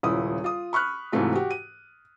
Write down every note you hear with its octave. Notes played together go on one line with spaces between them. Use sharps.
D#1 C#2 E4 D#6
F4 D#6
B5 C#6 F6 F#6
G#2 C3 E3 F#3 A3 F4
F#4 G4
D#7